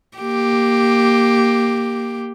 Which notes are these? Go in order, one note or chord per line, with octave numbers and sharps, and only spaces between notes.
A#3 G4